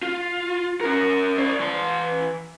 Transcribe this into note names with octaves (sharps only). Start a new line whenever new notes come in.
F4
C#4 A#4
C5 D5
E3 C6